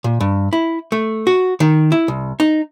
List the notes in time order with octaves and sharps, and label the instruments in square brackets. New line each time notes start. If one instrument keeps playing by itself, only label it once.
[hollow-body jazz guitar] A#2
G2
E4
A3
F#4
D#3
E4
C2
D#4